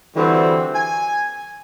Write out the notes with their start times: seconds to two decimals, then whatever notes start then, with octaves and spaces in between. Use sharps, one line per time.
0.16 D3 E3 G3 C4 F#4
0.75 G#5